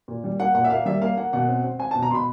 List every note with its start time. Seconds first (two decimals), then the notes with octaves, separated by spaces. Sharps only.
0.08 A#2
0.24 G3
0.40 A#3 F#5
0.55 A#2 F#5
0.64 E5
0.70 A#3 F5
0.86 G3 E5
1.01 A#3 F5
1.17 A#3 F#5
1.33 B2 F#5
1.48 C4
1.64 C4
1.79 C4 G#5
1.91 A5
1.95 B2
2.03 A#5
2.11 B2 B5 C6